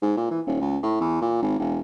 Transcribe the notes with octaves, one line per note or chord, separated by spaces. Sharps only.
G#2
A#2
E3
D#1
C#2
A2
E2
A#2
G#1
E1